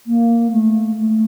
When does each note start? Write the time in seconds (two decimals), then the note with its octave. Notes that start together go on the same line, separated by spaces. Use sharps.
0.06 A#3
0.51 A3
0.97 A3